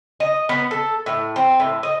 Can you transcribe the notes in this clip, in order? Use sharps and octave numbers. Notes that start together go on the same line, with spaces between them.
D#5
B3
A4
A2
C4
A2
D#5